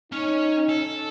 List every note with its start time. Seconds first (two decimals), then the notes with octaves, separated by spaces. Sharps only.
0.12 C#4 D#4 C#5
0.69 A4